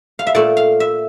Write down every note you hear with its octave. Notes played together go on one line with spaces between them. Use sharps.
F5
E5
A#2 A3 D5
F5
E5